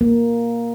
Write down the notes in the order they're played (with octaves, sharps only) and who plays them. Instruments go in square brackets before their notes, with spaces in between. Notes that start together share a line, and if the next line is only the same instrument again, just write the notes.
[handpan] A#3